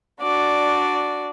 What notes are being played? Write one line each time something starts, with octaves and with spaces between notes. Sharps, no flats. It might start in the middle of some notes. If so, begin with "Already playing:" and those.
D4 F#4 D5